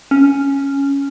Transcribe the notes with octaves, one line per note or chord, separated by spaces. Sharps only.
C#4